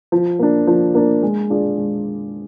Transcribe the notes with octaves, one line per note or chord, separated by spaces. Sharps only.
F3
A#3 D4
F3
A#3 D4
G#3
D4 F4 G#4 D5
G#3